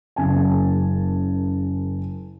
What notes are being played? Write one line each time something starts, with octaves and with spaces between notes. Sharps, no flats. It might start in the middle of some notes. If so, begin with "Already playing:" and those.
F#1 C#3 A#3 G#5 A5